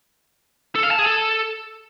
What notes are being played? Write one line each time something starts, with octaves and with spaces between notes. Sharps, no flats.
A4
F5
A5
G#4
A4